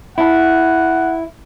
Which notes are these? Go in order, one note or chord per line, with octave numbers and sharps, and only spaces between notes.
E4 F#5 A5